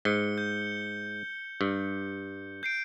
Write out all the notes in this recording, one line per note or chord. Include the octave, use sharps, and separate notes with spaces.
G#2 C#7 G7
G6
G2
G6 C7 D7